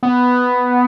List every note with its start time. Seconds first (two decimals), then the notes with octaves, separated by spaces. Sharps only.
0.03 B3